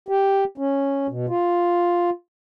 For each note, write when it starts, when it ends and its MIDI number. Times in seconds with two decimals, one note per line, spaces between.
0.08 0.44 67
0.58 1.07 61
1.09 1.26 47
1.29 2.10 65